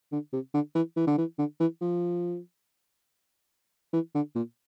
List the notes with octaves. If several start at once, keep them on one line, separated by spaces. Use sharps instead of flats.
D3
C3
D3
E3
E3
D3
E3
D3
E3
F3
E3
D3
A#2